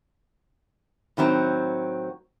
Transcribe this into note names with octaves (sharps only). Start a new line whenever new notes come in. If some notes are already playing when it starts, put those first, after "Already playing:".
A2 D#3 F#3 C4